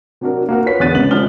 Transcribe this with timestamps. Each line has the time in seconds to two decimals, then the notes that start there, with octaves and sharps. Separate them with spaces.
0.21 C3 F#3 D4 F#4 A#4
0.49 A#3 F#4 A#4
0.66 F4 B4 C#5 B6
0.80 E2 D3 B3 F#6 A6 D#7
0.95 G#1 C#3 F#7
1.11 C3 F3 G#3 F6 G7